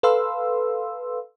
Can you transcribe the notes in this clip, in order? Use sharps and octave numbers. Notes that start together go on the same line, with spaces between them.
A4 B4 F5 C6 E6